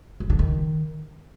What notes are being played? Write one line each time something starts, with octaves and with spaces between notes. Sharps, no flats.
G2
D3
D#3